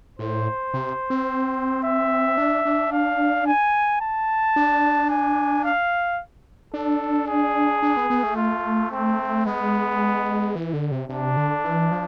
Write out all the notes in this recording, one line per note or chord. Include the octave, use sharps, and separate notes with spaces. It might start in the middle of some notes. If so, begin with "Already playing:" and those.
A2 C5
C3
C4
E5
D4
D4
F5
G#5
A5
D4
G#5
F5
D4 A4
G#4
D4
B3
B3
A3
F4
C4
G#3 B3
E3
D3
C3
C3 D4
D3
E3
F3